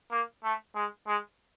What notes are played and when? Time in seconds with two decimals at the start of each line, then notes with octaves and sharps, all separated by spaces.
0.11 A#3
0.44 A3
0.75 G#3
1.07 G#3